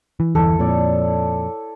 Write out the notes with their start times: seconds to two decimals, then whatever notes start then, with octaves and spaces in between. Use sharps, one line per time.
0.20 E3
0.35 G1 E2 E3 E4 A4
0.59 F2 A#2 C#5 D5